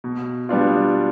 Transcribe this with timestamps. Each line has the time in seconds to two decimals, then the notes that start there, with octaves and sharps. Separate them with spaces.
0.04 B2
0.49 G3 B3 D4 F4